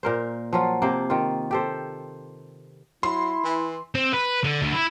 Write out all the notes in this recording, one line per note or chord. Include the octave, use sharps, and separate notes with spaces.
A#2 A#4 C5
F3 F#3 F4
C3 A#3 A#4 C5
D#3 F4
G4 A4 C5
F#3 E4 C6
E3
C4
B4
D3
D2
E4